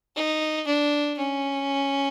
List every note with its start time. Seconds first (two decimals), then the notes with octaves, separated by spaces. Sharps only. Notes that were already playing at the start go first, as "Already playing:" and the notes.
0.16 D#4
0.66 D4
1.17 C#4